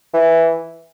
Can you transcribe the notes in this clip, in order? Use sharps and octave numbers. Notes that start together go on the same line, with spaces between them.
E3